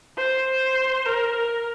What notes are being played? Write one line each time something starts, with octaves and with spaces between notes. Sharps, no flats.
C5
A#4
A#4